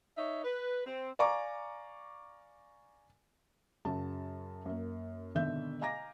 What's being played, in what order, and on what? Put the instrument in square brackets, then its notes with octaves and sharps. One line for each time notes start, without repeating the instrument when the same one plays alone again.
[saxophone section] D#4 C#5 E5
B4
C4
[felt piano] D5 F5 G#5 A#5 C#6 D6
F#2 C#3 F#3 A5
F#2 A#3
G#1 B2 D3 E5 G6
D#5 F5 G#5 A#5 D6 A#6